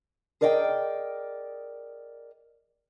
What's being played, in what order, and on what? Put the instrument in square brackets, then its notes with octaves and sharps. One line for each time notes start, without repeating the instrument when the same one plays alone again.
[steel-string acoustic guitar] G#4 A#4 D5 D#5 F5 G5